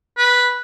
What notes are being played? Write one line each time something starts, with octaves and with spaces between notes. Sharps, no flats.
B4